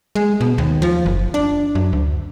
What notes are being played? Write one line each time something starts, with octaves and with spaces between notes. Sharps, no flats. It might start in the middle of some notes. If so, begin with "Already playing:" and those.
G#3
B2
D#2
F3
F#1
D4
F#2
D2